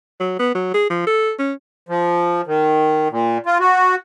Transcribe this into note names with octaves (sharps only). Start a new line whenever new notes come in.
F#3
B3
F#3
G#4
F3
A4
C#4
F3
D#3
A#2
F4
F#4